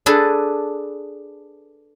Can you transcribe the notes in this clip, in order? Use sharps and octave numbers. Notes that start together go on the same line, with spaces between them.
D4 G#4 A4 B4